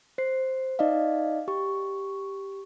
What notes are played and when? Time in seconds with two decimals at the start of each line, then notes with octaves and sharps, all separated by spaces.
0.18 C5 C7
0.79 D#4 D5 D#5 F5
1.48 G4 C#6